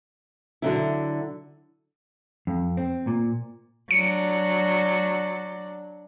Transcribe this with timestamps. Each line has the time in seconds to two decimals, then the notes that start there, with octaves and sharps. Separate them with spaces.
0.62 D3 F#3 E4
2.47 F2
2.77 C4
3.07 A#2
3.91 F#3 D4 C#7